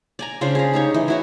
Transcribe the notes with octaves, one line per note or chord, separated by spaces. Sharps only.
D5 G#5 A#5
C#3 D4 F4 C5
G#4 A#5
D#4 G4 C#5
E3 D#5
E4 F#4 C#5